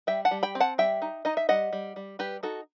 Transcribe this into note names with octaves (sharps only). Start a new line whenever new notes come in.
G3 E5 G5
F#5 A5
G3
G5 B5
C4
F#5 A5
G3 E5 G5
D#4
D#4 D#5
E5
G3 D#5 F#5
G3
G3
G3 G4 B4
D#4 F#4 A4